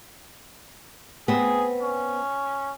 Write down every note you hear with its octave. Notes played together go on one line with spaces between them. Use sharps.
B3 C4 G#4
C#4